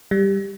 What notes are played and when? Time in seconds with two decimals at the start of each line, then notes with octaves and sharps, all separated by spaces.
0.11 G3